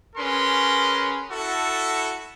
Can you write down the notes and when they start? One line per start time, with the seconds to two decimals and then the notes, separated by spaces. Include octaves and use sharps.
0.16 C#4 G#4 A#4 B4 C6
1.30 E4 F#4 A4